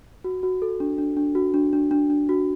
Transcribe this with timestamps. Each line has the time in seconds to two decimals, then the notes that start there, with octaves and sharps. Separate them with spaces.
0.24 F#4
0.43 F#4
0.62 A4
0.80 D4
0.98 D4
1.17 D4
1.35 F#4
1.54 D4
1.73 D4
1.91 D4
2.10 D4
2.29 F#4